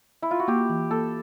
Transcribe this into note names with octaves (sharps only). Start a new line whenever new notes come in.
E4
F4
F#4
A#3 G4
E3
A#3 A4